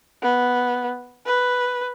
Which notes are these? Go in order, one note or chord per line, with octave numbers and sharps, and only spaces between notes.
B3
B4